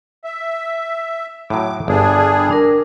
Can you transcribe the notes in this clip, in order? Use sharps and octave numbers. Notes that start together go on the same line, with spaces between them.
E5
A2 F#3 D6
G1 G3 D4 G#4
D4 A#4